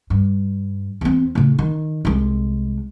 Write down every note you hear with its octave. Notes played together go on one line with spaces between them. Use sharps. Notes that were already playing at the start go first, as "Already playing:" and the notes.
G2
E2 C4
A2 C#3
D#3
C2 G#3